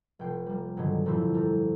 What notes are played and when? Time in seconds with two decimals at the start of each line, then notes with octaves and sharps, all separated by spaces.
0.19 F1 G5 C7
0.46 G3 A#3
0.77 G2 B2 D3 D#3 F#3 G#3
1.05 F2 A#2 F3 G3 C4 E4
1.34 G4 A4 A#4